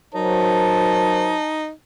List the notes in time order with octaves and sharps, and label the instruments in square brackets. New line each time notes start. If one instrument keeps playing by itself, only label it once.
[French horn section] F#3 A#4 C5 [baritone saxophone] D#4 [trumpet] A5